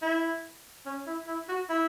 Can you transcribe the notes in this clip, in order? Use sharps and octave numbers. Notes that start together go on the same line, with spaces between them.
E4
C#4
E4
E4
F#4
E4